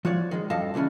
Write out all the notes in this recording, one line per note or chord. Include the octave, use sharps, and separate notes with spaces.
F3 F#4 C#5 D5
D#3 G#3
F#2 G3 A4 D#5 F5 A5
A#2 C#3 E3 C#4 D4